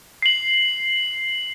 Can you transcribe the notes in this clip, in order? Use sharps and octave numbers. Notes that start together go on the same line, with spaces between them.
C7 F#7